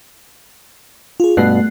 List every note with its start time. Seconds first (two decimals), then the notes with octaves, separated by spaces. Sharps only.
1.20 F4 G#4
1.37 G2 B2 A3 F#6 C7